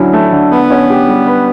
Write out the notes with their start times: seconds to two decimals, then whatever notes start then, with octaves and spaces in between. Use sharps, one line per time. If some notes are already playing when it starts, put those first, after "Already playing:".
Already playing: D3 F#3 C#4 E4
0.13 A3
0.32 D3
0.51 B3 B4
0.70 C#4
0.89 G4
1.08 G3
1.27 B4